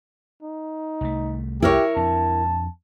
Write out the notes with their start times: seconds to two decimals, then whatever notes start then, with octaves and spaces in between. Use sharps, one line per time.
0.43 D#4
1.01 C2 A3
1.62 E4 G4 A#4 C#5
1.96 F2 C4 D4 A5